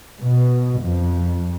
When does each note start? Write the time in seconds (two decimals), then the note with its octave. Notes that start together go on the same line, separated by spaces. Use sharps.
0.22 B2
0.80 F2